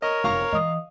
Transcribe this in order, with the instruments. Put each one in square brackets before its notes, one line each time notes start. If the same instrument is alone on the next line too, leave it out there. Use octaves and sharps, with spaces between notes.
[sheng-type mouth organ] A#4 C#5 [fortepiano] D#5
[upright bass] F1 [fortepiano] F5 A#5 C#6
[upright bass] E3 [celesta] D#5 D#6